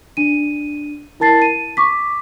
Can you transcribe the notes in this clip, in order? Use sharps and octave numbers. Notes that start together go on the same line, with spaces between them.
D4 D#7
E4 A#4 A5 A6 C7
D#7
C#6 D6 B6